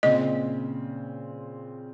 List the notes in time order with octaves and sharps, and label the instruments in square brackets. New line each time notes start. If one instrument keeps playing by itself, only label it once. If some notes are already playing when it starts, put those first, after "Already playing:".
[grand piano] A#2 C#3 C4 [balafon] D#5